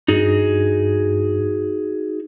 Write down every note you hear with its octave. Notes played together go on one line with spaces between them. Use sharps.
G2 D#4 F#4 G#4